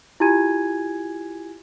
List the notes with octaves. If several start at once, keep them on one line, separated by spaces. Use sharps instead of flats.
E4 F4 G4 G#5 G#6 D#7